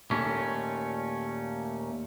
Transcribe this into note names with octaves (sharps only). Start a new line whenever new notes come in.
D#2 A#2 A3 C#4